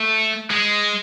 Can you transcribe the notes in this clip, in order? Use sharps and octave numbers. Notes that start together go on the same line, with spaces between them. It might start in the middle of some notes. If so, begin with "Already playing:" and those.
Already playing: A3
G#3